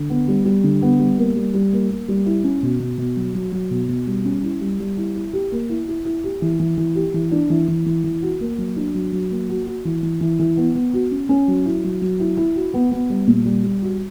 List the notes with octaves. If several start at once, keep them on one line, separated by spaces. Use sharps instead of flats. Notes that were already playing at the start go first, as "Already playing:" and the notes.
Already playing: D3
B3
G3
G3
D3
B3
G3
A#3
G3
G3
A#3
A#3
G3
E4
C#4
B2
B2
B2
F#3
F#3
F#3
B2
B2
G3
C#4
E4
G3
G3
E4
E4
G4
A#3
E4
E4
E4
G4
E3
E3
E3
G4
E3
D4
E3
E3
E3
E3
F#4
A#3
F#3
D4
F#3
F#3
A#3
F#4
F#4
E3
E3
E3
E3
B3
B3
F#4
C#4
C#4
F#3
E4
F#3
F#3
E4
E4
F#4
B3
B3
G3
A#2
G3
G3
F#4